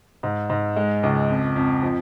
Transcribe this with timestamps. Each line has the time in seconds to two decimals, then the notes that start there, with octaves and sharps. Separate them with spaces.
0.23 G#2
0.50 G#2
0.76 G#3
1.03 C#2
1.29 F2
1.56 F2
1.82 F3